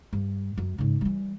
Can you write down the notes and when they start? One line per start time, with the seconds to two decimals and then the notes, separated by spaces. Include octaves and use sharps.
0.13 G2
0.58 F#2
0.78 G#2 C#3
1.01 E3 G3